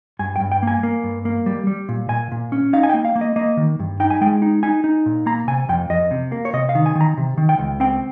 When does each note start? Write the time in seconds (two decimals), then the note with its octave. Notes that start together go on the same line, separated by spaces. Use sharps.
0.19 G2 G#5
0.36 G5
0.41 G2
0.52 G5
0.63 A#3 G#5
0.83 A#3
1.04 G2
1.25 A#3
1.46 G3
1.67 G3
1.89 A#2
2.09 A#2 G#5
2.32 A#2
2.52 C#4
2.73 D#4 F5
2.83 G#5
2.90 G5
2.94 A#3
3.05 F5
3.16 A#3
3.21 D#5
3.36 A#3 D#5
3.57 D#3
3.79 G2
4.00 D#4 G5
4.10 G#5
4.21 G#3 G5
4.42 D#4
4.63 D#4 G#5
4.84 D#4
5.06 A#2
5.26 A#3 A#5
5.48 C3 G#5
5.69 F2 G5
5.90 F2 D#5
6.11 C3
6.32 A#3
6.45 C#5
6.53 C3 D#5
6.69 F5
6.75 D#3
6.86 G#5
6.95 D#3
7.01 A#5
7.17 C3
7.38 D#3
7.49 G5
7.59 C#2
7.80 C4 G5